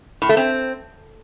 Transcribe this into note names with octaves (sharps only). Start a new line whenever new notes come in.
A2
A3
C4